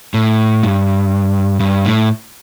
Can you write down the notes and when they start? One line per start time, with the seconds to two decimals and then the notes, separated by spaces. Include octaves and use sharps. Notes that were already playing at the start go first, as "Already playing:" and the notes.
0.14 A2
0.63 G2
1.60 G2
1.85 A2